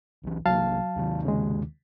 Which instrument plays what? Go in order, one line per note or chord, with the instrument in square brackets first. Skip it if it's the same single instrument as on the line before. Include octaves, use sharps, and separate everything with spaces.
[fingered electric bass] B1 E3
[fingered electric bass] B1 C3 A#3 [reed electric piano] F#3 F5 A5
[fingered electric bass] D#2 C3 D#3
[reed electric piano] C#3 G#3